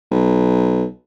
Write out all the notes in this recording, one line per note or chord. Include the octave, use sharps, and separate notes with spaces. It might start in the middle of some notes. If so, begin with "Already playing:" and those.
B1